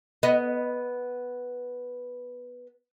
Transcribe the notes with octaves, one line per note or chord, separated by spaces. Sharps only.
B3 D#5